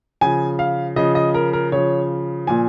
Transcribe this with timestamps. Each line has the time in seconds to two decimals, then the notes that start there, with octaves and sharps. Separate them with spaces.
0.21 C#3 F3 G#5
0.59 F5
0.96 C#3 F3 D#5
1.15 D#5
1.34 A#4
1.53 A#4
1.72 C#3 F3 C#5
2.47 A#2 F3 G#5